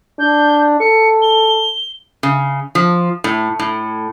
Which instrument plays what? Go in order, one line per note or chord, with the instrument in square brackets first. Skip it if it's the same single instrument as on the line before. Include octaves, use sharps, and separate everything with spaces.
[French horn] D4 [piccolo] G6
[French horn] A4 [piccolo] C#7
[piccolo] G7
[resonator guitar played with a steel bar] C#3
F3
A2
A2